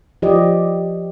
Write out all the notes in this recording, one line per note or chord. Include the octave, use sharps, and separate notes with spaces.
F3 G4 D5 D#5